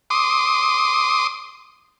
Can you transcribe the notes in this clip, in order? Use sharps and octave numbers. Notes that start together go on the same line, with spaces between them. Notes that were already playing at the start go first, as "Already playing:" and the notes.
C6 D6 D#6